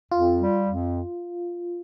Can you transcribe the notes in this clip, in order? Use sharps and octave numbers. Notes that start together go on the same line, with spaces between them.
F2 F4
G3
F2